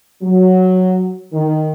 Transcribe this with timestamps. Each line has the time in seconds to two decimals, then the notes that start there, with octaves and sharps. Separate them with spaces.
0.23 F#3
1.33 D#3